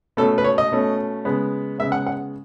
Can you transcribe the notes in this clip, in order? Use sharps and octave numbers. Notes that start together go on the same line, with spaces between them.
B2 A3 C#4 A4
B4
C#5
D#5
B2 A3 C#4
C#3 G#3 B3
C#3 G#3 B3 E5
F#5
F#5